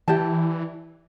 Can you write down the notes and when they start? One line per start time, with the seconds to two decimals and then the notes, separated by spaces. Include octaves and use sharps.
0.08 E3 E4 G4 D5 A5